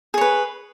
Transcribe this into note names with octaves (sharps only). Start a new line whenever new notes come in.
G#4 B4 C#5